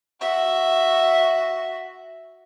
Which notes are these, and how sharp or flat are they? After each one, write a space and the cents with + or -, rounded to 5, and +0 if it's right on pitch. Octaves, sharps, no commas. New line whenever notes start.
F#4 +0 E5 +0